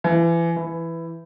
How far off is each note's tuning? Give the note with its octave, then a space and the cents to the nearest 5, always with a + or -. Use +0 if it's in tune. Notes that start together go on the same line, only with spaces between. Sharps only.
E3 +30
E3 +10